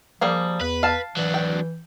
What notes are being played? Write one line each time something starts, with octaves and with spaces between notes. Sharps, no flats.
F3 G3 A#3 G#4
E2 B4
F5 A5
E3 F#3 D4
G5